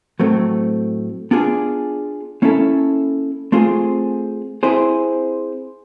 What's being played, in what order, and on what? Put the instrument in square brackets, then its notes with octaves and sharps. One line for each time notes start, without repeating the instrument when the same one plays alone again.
[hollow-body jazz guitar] A2 F#3 A3 C4
B3 D4 F4 G#4
A#3 C#4 E4 A4
A3 C4 F4 G#4
C4 E4 G#4 C5